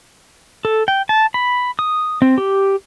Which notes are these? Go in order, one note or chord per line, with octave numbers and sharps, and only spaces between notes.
A4
G5
A5
B5
D#6
C4
G4